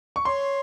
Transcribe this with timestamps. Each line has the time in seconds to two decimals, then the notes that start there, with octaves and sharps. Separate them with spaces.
0.16 C#6
0.25 C#5 C6